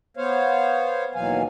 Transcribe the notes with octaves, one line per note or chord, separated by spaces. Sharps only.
B3 C5 C#5 F5
D#2 B2 E3 F#3 F5 G#5